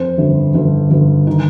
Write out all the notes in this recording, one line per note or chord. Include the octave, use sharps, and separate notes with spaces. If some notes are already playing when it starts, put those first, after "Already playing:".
Already playing: F2 C5
G1
G1
G1
D#3